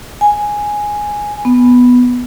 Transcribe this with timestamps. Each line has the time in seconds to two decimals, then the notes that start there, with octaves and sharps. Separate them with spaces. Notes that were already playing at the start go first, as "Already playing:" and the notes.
0.21 G#5
1.45 B3